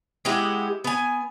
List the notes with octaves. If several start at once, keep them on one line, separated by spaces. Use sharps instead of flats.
G#3 B3 E4 G4
B3 G#5